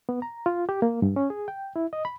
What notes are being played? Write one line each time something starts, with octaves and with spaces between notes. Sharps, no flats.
B3
A#5
F4
G4
A#3
G2
C#4
G#4
G5
E4
D#5
B5